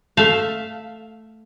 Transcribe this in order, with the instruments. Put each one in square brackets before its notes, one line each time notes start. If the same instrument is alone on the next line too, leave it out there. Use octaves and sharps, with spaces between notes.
[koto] A3 E5 F5